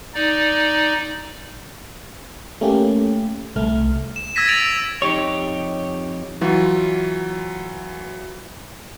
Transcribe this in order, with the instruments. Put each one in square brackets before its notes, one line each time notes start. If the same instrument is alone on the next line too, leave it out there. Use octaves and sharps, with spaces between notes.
[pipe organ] D#4 D5
[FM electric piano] A3 A#3 C#4 G4
C2 A3 F6
[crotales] E7
E6 G#6 A#6 B6 D#7 E7
A6 B6 D7 F7 F#7
E6
[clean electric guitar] F2 D#4 G4 C#5
[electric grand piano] E3 F#3 F4